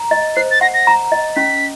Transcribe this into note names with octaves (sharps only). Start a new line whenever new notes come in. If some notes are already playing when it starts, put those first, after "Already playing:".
Already playing: A#5
D#5
C5 C7
A6
F#5 A#6
A#6
A#5
D#5
C#4 B6